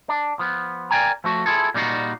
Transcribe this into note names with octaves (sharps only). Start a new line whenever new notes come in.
D4
F3 B3
A#4 D5 E5 G5 G#5 A#5
F3 A3 F#4
E4 F4 G#4 A4
A#2 G3 D#4 F4 F#4